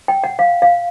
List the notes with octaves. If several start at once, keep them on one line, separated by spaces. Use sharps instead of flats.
G5
F#5
F5
F5